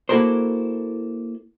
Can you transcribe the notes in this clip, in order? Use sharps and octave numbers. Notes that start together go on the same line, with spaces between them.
A#3 E4 F#4 A4 A#4 C5